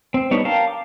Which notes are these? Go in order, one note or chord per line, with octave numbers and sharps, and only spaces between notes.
C4
G3 B3 D4 D#4 C#5
A#4 F5 G5 A5 A#5
D6